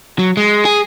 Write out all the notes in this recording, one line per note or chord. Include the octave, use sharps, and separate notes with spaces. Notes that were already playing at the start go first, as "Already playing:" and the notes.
F#3
G#3
G#4